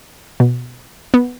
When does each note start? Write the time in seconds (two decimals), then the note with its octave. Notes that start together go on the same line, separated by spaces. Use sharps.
0.40 B2
1.14 B3